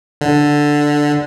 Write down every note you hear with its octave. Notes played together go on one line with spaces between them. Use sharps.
D3